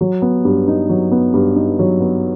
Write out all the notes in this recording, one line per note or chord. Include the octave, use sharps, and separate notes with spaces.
F#3
B3
G2
D#4
F#3
B3
G2
D#4
F#3
B3